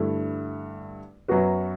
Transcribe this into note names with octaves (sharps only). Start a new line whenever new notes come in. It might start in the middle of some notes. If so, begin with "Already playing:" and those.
Already playing: G2 D3 A3 E4
F#2 F#3 B3 F#4 B4